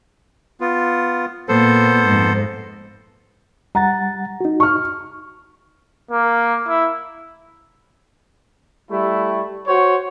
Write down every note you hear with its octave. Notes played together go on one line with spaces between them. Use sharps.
B3 F4
A#2 B3 A4 C5
F2 G#2
G3 F#5 A#5 A6
D#4 F#4
C#6 F6
A#3
E4
G3 A3 E4
F#4 C5 C#5